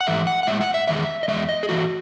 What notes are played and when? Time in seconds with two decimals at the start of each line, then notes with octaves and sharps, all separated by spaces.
0.01 F#5
0.07 G#2 E3 A3 E5
0.27 F#5
0.43 F#5
0.47 A2 G#3 E5
0.61 F#5
0.74 E5
0.88 E2 D#3 G#3 E5
1.23 D#5
1.28 E2 D#3 G#3 E5
1.49 D#5
1.63 G#4
1.69 A2 E3 A3 F#4